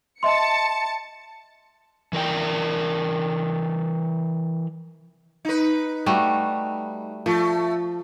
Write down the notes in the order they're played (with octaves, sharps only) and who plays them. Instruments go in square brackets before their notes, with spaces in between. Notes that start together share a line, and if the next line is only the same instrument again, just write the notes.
[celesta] D#5 E5 C6 [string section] A5 C#7
[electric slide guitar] E3 A#4 D5 G5
[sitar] D#4 B4
[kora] G3 A3 F#4
[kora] F3 [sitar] A3